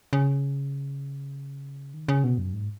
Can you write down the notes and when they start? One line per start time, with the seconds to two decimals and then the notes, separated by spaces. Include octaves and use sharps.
0.13 C#3
1.94 D#3
2.08 C#3
2.24 B2
2.38 F#2
2.53 G#2